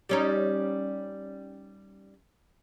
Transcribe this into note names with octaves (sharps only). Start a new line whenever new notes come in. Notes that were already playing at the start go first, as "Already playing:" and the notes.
G3 C#4 D#4